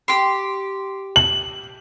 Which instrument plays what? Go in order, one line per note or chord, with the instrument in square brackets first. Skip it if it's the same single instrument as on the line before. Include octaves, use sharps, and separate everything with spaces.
[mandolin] G4 C6
[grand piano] F#7